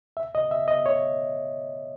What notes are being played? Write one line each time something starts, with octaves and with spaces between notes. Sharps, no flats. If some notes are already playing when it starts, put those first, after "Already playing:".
E5
D#5
E5
D#5
C#5